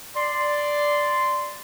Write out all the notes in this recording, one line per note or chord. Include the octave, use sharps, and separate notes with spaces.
D5 C6